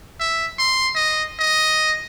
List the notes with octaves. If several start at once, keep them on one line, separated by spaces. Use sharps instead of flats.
E5
C6
D#5
D#5